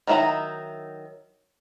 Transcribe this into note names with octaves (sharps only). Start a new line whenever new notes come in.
D#3 F#3 D#4 E4 A#5